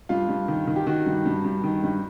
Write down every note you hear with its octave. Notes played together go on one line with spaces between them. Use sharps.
G2 F4
G2
D#3
D#3
G4
D#3 F#4
G2
G2
G2
D#3
G2